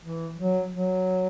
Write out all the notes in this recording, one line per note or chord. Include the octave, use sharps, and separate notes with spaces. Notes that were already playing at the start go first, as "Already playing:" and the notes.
E3
F#3
F#3